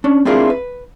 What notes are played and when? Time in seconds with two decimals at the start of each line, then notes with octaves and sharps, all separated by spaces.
0.04 C#4 D4
0.25 C4 D4 E4 F4 G#4 A#4
0.50 B4